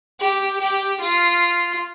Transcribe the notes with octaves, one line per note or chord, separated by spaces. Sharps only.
G4
G4
F4